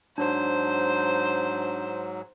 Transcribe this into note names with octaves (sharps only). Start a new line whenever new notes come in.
G#2 F#3 D4 C5